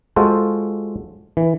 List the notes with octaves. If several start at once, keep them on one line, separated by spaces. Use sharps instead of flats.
G#3 F4 F#4 A4 C5
E3